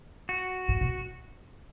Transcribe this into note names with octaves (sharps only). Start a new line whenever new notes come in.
F#4
A2
B2